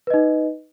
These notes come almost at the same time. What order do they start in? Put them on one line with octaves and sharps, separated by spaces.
B4 D#5 D#4